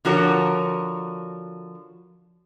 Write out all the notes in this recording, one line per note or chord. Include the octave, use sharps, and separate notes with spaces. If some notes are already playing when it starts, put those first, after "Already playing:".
D3 F3 F#4 A#4 C#5